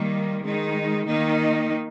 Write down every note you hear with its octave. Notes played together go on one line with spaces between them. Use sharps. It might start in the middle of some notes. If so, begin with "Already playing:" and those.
Already playing: D#3 G3 A#3
D#3 G#3 D#4
D#3 A#3 D#4